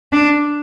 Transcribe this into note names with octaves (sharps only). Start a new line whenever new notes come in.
D4